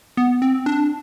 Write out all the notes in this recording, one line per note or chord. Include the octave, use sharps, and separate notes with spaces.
B3
C4
D4